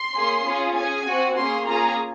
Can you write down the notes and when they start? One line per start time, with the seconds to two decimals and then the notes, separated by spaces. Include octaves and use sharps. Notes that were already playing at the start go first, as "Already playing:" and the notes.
Already playing: C6
0.15 A#3 C#4 G#4
0.46 C#4 F4 G#4
0.75 C#4 G#4 G#5
1.06 C4 F#4
1.36 A#3 C#4 G#4 C6
1.65 A#3 C#4 F4 G#4 A#5